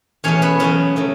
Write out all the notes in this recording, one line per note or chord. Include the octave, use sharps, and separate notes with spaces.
E2 B2 A3 C#4 C#5
B3 B4
E2 C#3 F#3 B3 C#4
C#3 F#3 A3